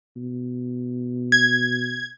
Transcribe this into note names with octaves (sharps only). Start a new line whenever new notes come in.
B2
G#6